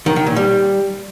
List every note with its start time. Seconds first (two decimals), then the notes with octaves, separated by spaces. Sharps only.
0.06 D#3
0.16 D#3
0.26 A#2
0.36 G3